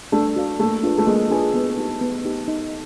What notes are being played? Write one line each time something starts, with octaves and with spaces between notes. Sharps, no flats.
A3 D4
F#4 A4 D5 F5
A3 A#3
D4 F4 G#4 B4
A3
G#3 A#3
D4 F4 G#4 B4
B3
D#4 G4
B3
D#4 G4
D#4